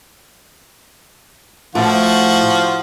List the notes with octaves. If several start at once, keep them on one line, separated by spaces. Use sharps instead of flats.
A2 F3 F#4